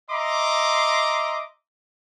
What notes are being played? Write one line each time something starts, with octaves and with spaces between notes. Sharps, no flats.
D#5 E5 A#5 C6 D6